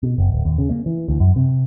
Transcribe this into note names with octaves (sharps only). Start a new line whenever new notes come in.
B2
F#1
D1
D#2
C#3
A#3
E3
D2
F#2
C3